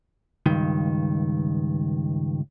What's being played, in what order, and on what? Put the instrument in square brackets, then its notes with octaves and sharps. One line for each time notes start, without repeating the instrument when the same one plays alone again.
[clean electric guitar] C#2 G2 D#3